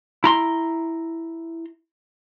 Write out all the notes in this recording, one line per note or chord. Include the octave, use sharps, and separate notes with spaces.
E4 A#5 C6